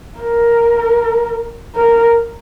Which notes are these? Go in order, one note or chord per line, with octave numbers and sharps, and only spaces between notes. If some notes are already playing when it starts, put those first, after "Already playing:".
A#4
A#4